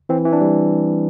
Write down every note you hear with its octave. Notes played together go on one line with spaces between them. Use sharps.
E3 C4
E3
D4
G3